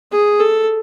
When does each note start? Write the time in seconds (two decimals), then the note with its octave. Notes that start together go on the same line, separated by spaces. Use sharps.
0.12 G#4
0.40 A4